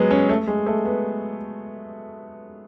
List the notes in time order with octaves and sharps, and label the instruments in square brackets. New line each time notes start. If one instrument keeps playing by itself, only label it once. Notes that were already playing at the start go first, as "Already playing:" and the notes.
Already playing: [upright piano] F#3 G#3 B3
C#4
A3
G#3
A3
B3